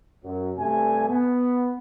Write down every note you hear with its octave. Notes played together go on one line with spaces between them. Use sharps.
F#2 F#3
G2 C3 A3 G#5
B3